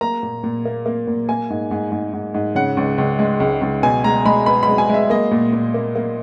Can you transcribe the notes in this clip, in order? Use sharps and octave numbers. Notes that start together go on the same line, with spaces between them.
A#3 A#5
A#2
A#2
A#3
A#3
A#2
A#3 G#5
G#2
G#2
G#2
G#2
G#2
C#3 F#5
C#2
C#2
G#3
C#2
C#2
B2 G#5
G#3 A#5
G#3 B5
B3 B5
G#3 B5
G#5
G#3 E5
A#3 D#5
A#2
A#2
A#3
A#3